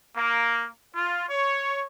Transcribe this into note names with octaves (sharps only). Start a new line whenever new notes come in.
A#3
F4
C#5